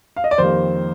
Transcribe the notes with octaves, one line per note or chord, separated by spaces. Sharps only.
F5
D#5
D5
F2 D#3 G3 A#3 C5